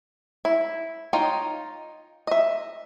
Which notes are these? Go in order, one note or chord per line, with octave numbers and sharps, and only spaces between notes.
E4
D#4 F4 C#5 D#5 G5
D#5 E5